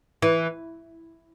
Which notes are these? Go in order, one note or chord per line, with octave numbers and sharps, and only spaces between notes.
E3